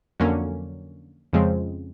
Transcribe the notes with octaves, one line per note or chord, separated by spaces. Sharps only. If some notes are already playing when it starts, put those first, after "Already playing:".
F2 D3 F#3 A#3 C#4
F2 C#3 F3 G#3 C4